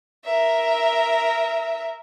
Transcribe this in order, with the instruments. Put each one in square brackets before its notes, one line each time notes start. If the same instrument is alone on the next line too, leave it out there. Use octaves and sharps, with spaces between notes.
[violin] A#4 E5